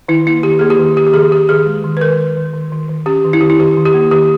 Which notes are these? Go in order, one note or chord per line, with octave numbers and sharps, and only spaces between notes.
D#3 E4
A#3 E4
D#3 G4
A#3 G#4
G4
D#3
D#3 G4
G4
D#3 G#4
D#3 G4
D#3 G#4
G#3
D#3
B4
D#3 A#4
D#3
D#3
D#3
D#3
D#3
C#4 G4
D#3
E4
D#3 G4
E4
D#3 G4
D#3
G4
A#3
D#3 G4